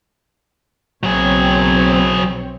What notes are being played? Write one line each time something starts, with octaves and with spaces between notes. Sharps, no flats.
B1 F#3 C4 G#4 C#5